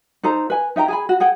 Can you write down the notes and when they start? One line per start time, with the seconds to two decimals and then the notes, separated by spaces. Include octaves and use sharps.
0.23 D#4 A4 C5 A#5
0.50 B4 G#5
0.76 D#4 E5 G5 A#5
0.88 G#4 G#5 B5
1.09 F#4
1.20 G#4 F#5 G5